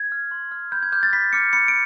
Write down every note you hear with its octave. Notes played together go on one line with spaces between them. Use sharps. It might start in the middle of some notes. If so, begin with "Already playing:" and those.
Already playing: G#6
F6
C6
F6
B5 G6
G#6
D6 F6 G6
A6
B5 B6
D6 F6 C#7
B5 C#7
D7